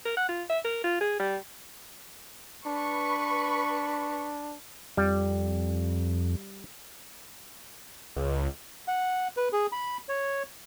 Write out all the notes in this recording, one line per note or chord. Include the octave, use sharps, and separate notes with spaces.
A#4
F#5
F4
E5
A#4
F4
G#4
G3
D4 B4 B5 C#6
F2 G3
C#2
F#5
B4
G#4
B5
C#5